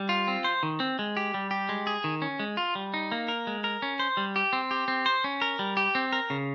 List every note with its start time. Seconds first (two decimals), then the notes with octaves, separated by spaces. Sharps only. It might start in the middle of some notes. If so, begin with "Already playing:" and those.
Already playing: G3
0.09 F4
0.28 C4
0.44 C5
0.63 D#3
0.80 C4
0.99 G#3
1.17 G4
1.34 G3
1.51 G4
1.69 G#3
1.87 G#4
2.04 D#3
2.22 C#4
2.39 G#3
2.57 F4
2.75 G3
2.94 D#4
3.12 A#3
3.28 A#4
3.47 G#3
3.64 A#4
3.82 C#4
4.00 C5
4.17 G3
4.36 G4
4.53 C4
4.71 G4
4.88 C4
5.06 C5
5.24 C#4
5.42 A#4
5.59 G3
5.77 G4
5.95 C4
6.13 A#4
6.30 C#3